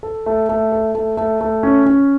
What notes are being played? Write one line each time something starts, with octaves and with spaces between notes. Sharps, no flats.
A4
A3
A3
A4
A3
A3
A3
C#4
C#4